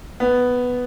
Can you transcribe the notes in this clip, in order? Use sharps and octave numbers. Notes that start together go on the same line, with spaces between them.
B3